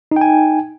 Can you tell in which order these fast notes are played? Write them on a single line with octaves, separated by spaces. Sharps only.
D#4 G5 G#5